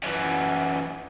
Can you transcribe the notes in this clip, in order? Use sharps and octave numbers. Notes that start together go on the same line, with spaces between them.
F#2 E3